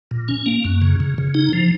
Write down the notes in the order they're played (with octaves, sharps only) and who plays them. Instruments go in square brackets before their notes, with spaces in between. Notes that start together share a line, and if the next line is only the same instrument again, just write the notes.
[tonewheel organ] A#2
C#4
A#3
F#2
C#3
C#3
C#3
D#4
F3